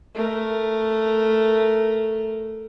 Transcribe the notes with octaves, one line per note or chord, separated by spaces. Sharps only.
A3 A#4